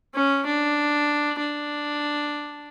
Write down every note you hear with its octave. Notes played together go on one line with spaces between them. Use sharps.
C#4
D4
D4